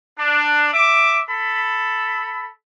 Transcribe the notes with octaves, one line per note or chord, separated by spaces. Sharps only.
D4
E5 D6
A4 B5